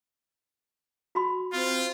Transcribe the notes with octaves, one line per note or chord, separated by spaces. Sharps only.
F#4 B5 C6
C4 F4